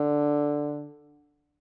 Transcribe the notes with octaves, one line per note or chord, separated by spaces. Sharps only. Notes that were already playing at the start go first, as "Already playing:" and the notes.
Already playing: D3